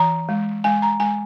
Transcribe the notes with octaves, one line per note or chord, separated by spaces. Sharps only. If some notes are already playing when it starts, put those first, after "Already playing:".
Already playing: E3 A#5
G#3
G#3 G#5
A#5
G#3 G#5